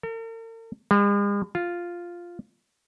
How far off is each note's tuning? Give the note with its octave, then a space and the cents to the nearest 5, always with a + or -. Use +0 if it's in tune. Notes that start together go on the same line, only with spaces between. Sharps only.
A#4 -45
G#3 -45
F4 +0